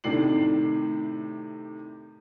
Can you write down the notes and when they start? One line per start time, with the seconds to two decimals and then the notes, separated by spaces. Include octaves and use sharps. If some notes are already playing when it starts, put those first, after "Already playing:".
0.04 A2 C3 D#3 D4 C7 F#7